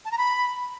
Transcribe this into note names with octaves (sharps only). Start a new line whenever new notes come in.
A5
A#5
B5